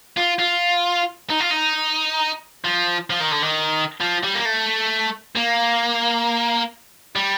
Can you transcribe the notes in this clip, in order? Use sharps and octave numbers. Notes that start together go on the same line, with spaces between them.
F4
F4
D#4
F4
D#4
F3
F3
D#3
D3
D#3
F3
G3
A#3
A3
A#3
G3